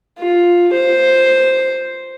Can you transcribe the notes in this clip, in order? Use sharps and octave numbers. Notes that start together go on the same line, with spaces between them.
F4
C5